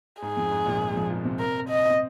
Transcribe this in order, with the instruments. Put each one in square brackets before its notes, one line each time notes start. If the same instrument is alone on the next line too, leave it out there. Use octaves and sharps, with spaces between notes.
[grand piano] G#2 [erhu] G#4
[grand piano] F2
G#2
A#1 A#2
G#2
G#3
F2 F3
A#2 A#3
C3 C4
[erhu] A#4
D#5
[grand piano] C4